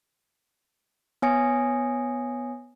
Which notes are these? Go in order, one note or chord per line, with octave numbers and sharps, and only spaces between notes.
B3 C#5 G#5 D#6 A#6 C#7